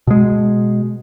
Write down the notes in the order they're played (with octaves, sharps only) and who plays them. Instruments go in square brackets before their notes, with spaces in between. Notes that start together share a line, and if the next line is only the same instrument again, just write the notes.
[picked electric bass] B2 G#3